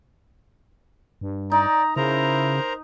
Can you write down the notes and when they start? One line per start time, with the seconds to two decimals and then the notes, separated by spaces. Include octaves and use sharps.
1.21 G2
1.52 D#4 D5 A#5
1.96 C#3 E4 A#4 C5 A#5